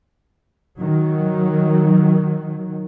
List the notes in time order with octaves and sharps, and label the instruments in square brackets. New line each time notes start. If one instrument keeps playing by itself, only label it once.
[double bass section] D#3 F#3